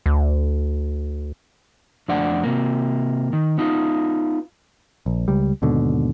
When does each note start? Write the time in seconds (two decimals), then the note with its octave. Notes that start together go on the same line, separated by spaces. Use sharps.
0.06 D2
2.08 F2 A3 D4 D5 F#5
2.44 C3 A#3
3.33 D#3
3.58 B3 D#4 F4
5.06 A#1
5.28 C#2 G3
5.62 D#2 G#2 B2 D3